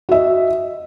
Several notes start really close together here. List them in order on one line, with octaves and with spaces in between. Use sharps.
F#4 E5 D#5